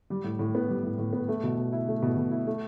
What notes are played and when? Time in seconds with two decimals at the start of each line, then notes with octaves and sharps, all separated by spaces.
0.10 G3
0.24 A2
0.39 A2
0.55 B3
0.69 G3
0.83 A2
0.98 A2
1.13 B3
1.28 A3
1.43 B2
1.57 B2
1.72 E4
1.88 A3
2.02 B2
2.17 B2
2.31 E4
2.47 A3